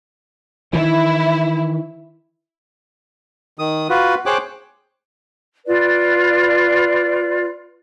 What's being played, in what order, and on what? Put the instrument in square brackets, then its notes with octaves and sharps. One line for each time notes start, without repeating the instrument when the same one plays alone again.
[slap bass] D#3 E3 [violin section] E4
[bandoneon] D#3 D#6
F4 F#4 B4
G#4 C5 C#5 G5 D6 F#6
[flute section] F4 B4 D5